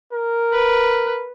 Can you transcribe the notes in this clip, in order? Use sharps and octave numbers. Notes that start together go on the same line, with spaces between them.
A#4
B4